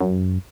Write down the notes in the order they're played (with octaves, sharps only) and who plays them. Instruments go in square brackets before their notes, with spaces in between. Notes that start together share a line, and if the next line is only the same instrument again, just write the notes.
[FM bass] F#2